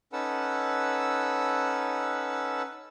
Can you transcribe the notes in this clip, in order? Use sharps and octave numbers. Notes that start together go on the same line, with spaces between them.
C#4 D#4 A4 B4 F#5 E6